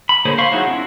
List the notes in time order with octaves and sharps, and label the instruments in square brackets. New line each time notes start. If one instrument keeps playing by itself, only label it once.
[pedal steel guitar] B5
D3 A#3 G#4 C5 C#5
C5 F5 B5 C#6
F#3 D#4 E4 F#4 G#4
C4 D4 E4